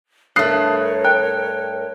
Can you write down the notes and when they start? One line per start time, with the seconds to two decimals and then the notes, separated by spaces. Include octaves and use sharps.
0.36 G2 A3 A#4 C#5 D#6 F#6 C7
1.05 G5 F#6